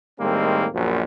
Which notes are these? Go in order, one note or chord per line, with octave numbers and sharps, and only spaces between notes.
A2 D#3 G3 G#3 A#3 C4
A#1 F#2